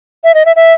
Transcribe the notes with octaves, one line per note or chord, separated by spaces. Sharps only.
E5
D#5
E5
E5